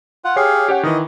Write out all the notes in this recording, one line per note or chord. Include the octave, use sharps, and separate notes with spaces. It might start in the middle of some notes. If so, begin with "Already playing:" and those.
F4 F#5
G4 G#4 C#5 F5 C7
C#4 G4 C#5 F#5
D#3 E3 D#5